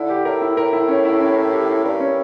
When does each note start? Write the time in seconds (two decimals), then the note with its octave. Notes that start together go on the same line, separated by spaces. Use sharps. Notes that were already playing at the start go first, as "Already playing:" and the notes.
Already playing: D3 E4
0.09 G4
0.25 A2 A#4
0.42 E4
0.57 A#4
0.73 E4
0.88 C#4
1.05 E4
1.21 C#4
1.37 A#4
1.52 G4
1.68 E4
1.84 G2 A#4
2.00 C#4